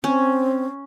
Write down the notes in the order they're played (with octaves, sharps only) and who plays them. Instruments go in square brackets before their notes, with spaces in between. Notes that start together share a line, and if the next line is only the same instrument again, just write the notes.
[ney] C4 [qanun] C#4